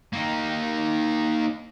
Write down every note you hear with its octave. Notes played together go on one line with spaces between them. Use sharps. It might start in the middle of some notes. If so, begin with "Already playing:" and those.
A#3 D#4